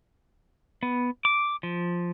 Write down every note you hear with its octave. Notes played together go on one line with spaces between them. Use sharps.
B3
D6
F3